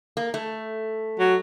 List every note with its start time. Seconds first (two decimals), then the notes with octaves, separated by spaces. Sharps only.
0.17 A#3
0.34 A3
1.19 F#3